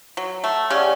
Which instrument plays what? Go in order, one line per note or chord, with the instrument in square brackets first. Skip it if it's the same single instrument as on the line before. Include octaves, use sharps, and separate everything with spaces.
[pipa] F#3
A3
[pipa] C#3 C#4 [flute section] G4 D5 F#5